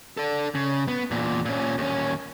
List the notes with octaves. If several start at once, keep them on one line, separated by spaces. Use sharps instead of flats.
A4 D5
C#3
B3
E2 A#2
A#2 C#4
D#2 C#4